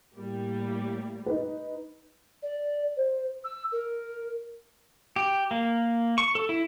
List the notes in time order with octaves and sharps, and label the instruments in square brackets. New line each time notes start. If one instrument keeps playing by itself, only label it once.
[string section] A2 G3 A#3
[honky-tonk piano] D#4 B4
[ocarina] D5
C5
E6
A#4
[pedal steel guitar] G4
A#3
C#6
A4
E4